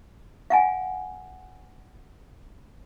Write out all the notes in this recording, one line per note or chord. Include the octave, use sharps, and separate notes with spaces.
F5 F#5 G#5